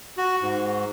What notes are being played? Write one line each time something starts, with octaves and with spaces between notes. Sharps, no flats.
F#4
G#2